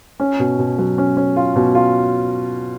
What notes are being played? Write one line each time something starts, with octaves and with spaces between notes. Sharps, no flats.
C#4
B2
B2
F#3
C#4
C#4
F4
B2
F4